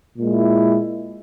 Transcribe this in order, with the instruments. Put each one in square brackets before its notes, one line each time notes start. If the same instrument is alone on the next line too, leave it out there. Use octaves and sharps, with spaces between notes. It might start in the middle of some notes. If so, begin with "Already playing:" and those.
[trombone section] A#2 G#3 E4